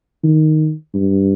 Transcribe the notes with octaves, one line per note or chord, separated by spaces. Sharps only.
D#3
G2